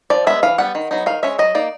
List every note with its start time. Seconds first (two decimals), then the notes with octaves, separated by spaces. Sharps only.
0.10 F3 D5
0.27 G#3 B3 E5
0.43 E3 F5
0.58 G3 B3 F#5
0.75 D#3
0.91 F#3 B3 D#4
1.06 D#3 F5
1.23 G#3 C#4 E5
1.39 F#3 D#5
1.55 A#3 D#4 D5